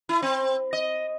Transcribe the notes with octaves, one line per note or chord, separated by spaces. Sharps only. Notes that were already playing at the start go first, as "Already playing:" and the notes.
E4
C4
D#5